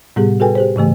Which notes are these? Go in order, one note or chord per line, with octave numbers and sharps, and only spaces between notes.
A2 C3 G3 B3 G4 G#4
F#4 G#4 A4 B4 G5 G#5
G4 G#4 C5
G#2 C#3 E3 A3